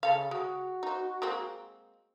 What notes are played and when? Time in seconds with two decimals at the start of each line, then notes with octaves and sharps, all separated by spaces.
0.03 C#3 A4 F5
0.31 G#3 F#4
0.83 D#4 C5
1.22 G#3 A#3 C4